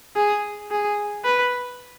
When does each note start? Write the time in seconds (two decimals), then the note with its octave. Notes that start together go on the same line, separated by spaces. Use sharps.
0.16 G#4
0.71 G#4
1.25 B4